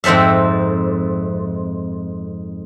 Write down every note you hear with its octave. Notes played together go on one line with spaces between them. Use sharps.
F2 G#2 C4 A4 E5